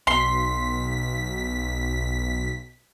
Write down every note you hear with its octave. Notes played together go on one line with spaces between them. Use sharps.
B1 C6 B6